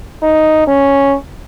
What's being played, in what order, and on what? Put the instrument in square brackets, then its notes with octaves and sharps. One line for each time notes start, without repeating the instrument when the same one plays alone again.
[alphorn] D#4
C#4